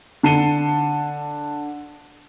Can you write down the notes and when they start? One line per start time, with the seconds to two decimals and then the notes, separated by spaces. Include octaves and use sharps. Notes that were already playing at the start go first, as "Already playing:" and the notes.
0.23 D3 A5 C7 C#7 D#7 G7